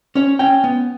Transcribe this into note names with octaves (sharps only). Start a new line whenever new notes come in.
C#4 C#5
C#4 G5
B3